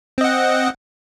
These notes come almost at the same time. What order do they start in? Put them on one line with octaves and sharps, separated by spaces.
C4 D#5 F#5